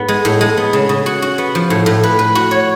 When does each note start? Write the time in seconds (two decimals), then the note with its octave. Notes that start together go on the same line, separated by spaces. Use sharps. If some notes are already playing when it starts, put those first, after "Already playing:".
Already playing: G#2 B3
0.08 G#3
0.25 A2
0.41 G#3
0.57 B3
0.73 C#3
0.89 C#3
1.06 F#4
1.22 F#4
1.38 B3
1.55 F3
1.70 A2
1.86 A2
2.03 B4
2.19 B4
2.35 F#4
2.51 C#5